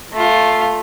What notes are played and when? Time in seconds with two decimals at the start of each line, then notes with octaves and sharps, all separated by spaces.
0.13 A3 F4